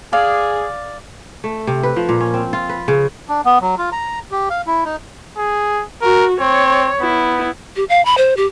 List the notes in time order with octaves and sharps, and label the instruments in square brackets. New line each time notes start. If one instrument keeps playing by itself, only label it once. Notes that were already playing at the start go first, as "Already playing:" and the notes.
[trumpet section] G#4 [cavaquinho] D5 F5
[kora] A3
C3
B4
F3
A#2
C#4
C4
F4
B4
C#3
[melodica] D4
B3
F#3
F4
A#5
G4
F5
E4
D#4
[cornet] G#4
[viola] F#4 [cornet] A#4
[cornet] C4 [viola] C#5
[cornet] B3 [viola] E4
[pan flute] G4
F5
B5
C5
G4